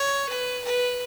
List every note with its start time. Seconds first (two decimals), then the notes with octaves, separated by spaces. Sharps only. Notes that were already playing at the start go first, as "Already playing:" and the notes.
Already playing: C#5
0.29 B4
0.64 B4